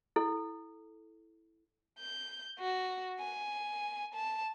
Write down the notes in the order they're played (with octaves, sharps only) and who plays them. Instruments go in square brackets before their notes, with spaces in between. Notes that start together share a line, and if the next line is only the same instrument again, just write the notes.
[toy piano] E4 A4
[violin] G6
F#4
G#5
A5